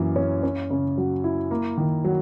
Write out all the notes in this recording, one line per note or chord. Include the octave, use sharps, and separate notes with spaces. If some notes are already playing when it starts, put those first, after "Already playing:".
Already playing: F#2 E3 A#3
C#4
C#4
C#3
F#3
E4
A#3
D#3
F#3